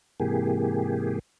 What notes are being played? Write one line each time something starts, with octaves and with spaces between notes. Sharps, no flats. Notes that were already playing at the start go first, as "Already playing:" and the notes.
G#2 C3 E3 A#3 G4 G#4